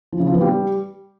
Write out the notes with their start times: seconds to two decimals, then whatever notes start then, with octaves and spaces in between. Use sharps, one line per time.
0.12 F3
0.20 C#3
0.27 F3
0.34 B3
0.41 G3